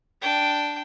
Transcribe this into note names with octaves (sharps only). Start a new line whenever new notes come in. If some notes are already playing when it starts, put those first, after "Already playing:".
D4 G5